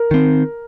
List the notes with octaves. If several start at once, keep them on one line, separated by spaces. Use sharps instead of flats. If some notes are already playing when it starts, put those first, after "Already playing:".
Already playing: A#4
D#3 C4